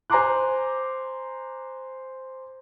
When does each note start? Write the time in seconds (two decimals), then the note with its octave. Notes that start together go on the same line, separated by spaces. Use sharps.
0.10 C5 G#5 A#5 C6 D6 F#6